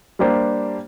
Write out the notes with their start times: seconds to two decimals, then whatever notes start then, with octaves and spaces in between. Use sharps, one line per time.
0.19 G3 A#3 D4 G4 C5